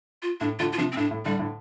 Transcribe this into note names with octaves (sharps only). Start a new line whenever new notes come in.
F4
A2 D4
A2 D3 F4
F4
C3 F3 D4
C4
A2 D4
A2
A2 D3 G3
A2 D3